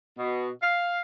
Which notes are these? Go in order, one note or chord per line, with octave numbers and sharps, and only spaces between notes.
B2
F5